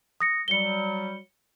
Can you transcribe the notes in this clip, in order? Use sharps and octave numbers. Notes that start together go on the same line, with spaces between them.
D#6 A#6 C#7
F#3 G3 C#7 G7